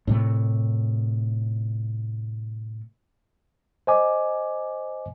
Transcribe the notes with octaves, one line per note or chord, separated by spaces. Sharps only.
A2 C3 A3
C5 D#5 G#5 D6